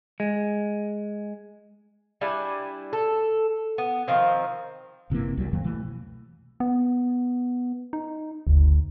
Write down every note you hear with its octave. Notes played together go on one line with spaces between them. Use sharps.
G#3
G3 D4 E4 G#5
A4
B3
D#3 F3 C4
F#1 C3 E3 A#3
C2 F#3 G3
F2 D#3 F#3 A#3
B2 E3 A3
B3
D#4
F#1 D2